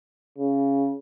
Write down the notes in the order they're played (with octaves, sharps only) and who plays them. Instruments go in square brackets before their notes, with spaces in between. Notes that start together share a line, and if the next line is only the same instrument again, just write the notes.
[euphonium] C#3